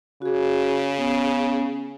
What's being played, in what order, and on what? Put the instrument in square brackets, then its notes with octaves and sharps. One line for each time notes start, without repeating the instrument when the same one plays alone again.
[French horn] C#3 [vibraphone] F#4 G#4
[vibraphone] B3 C#4